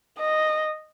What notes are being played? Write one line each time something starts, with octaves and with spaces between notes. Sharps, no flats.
D#5